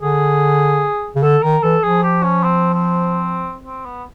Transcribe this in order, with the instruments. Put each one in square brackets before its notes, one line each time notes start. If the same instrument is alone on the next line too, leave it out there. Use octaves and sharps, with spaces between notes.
[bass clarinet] D3 [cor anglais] G#4
[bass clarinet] C#3
[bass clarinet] D3 [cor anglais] A4
[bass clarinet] D#3 [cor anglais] A#4
[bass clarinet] E3 [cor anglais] A4
[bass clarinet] F3 [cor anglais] G#4
[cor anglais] G4
C#4
C4
C4
C4
B3